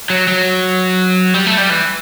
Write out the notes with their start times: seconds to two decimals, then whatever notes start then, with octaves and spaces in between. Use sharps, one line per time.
0.10 F#3
0.28 F#3
1.34 G3
1.46 A3
1.58 G3
1.70 E3